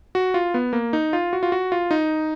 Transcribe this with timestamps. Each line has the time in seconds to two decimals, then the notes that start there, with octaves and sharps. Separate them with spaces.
0.15 F#4
0.34 F4
0.54 B3
0.73 A#3
0.93 D#4
1.13 F4
1.33 F#4
1.43 F4
1.52 F#4
1.72 F4
1.91 D#4